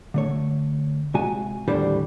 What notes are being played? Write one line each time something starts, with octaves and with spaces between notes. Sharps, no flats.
D3 A3 C#5
C3 G#3 F#4 G#5
D#2 A2 D3 G3 C5